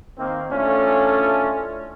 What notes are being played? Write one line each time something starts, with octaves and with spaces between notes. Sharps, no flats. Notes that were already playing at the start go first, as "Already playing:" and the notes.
D#3 A#3 C4
A3 C#4 D4 E4 F4 A4